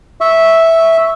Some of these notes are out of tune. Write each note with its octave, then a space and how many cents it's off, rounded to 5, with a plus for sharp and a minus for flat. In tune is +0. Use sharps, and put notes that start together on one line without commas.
E5 -5 C#6 +0